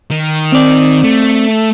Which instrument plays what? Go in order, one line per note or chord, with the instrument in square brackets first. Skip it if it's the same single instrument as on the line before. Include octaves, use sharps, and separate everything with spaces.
[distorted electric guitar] D#3
[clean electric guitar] C4 D5
[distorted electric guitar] A3